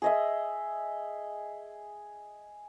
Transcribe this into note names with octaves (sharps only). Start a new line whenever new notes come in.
G#4 D#5 E5